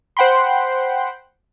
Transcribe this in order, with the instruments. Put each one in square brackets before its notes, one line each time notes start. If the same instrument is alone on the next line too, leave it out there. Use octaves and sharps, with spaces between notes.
[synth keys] C5 F#5 G5 B5 C6